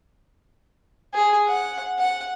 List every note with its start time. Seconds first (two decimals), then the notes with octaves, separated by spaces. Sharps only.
1.14 G#4
1.47 F#5
1.99 F#5